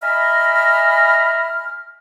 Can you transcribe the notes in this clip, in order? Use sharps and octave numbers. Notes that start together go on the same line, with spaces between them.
D#5 E5 G#5 A#5 B5 F6